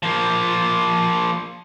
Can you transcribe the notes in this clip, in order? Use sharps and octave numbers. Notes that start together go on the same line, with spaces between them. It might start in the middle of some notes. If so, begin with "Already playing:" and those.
F3 A#3